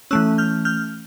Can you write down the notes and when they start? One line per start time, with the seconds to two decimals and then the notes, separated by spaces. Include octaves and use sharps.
0.11 E3 A3 C#4 E6 F#6
0.38 F6 G6
0.65 F6 G6